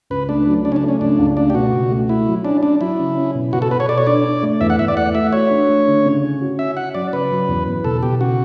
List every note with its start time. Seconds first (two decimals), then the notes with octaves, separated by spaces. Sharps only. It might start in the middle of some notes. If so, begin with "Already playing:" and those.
0.10 C#2 B4
0.29 A3 D4
0.47 F#3
0.64 C#3 D4
0.72 C#4
0.76 D4
0.83 A3
0.88 C#4
1.01 C#2 D4
1.19 C#2
1.37 A3 D4
1.50 G4
1.55 B2 F#4
1.73 C#2
1.91 A3
2.09 A3 E4
2.27 F#3
2.44 C#4 D4
2.63 C#4 D4
2.80 F#3 E4
2.99 C#3
3.16 C#4
3.35 B2
3.53 B2 F#4
3.62 A4
3.71 B2 B4
3.80 C#5
3.88 A4 D5
3.98 C#5
4.07 D4 D5
4.25 D4
4.42 A3
4.61 E2 E5
4.70 F#5
4.79 E2 E5
4.88 D5
4.97 A3 F#5
5.14 A3 E5
5.33 F#4 C#5
5.51 D4
5.69 A3
5.87 D3
6.05 C#3
6.23 C#4
6.41 F#4
6.58 C#4 E5
6.77 C#4 F#5
6.94 F#3 D5
7.13 C#3 B4
7.31 F#3
7.48 E2
7.67 E2
7.85 B2 A4
8.03 B2 G4
8.21 C#3 F#4